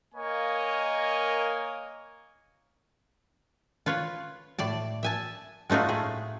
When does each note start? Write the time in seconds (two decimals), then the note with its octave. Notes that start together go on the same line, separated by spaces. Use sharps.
0.14 A#3 A#4 C#5 D#5 F5 G#5
3.86 F4 B4 C#5
4.59 A2 D5 A5
5.03 E5 G#5 A5
5.70 G#3 A3 D#4 F4 F#4
5.88 A2 A3 G#4